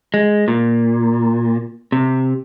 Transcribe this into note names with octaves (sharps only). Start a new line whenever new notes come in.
G#3
A#2
C3